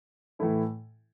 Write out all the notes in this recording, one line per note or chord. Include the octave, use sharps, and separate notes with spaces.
A2 E3 A3 E4 A4